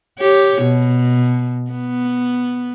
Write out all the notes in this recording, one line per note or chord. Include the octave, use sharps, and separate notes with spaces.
G4 C#5
B2
B3